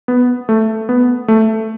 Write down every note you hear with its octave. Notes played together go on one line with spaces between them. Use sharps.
B3
A3
B3
A3